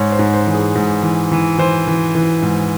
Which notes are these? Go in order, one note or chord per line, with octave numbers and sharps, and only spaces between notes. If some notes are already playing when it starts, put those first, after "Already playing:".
Already playing: G#2 C#5
C5
G#2
C5
E3
G#4
G#2
E3
E3
E3 C5
E3
E3
G#2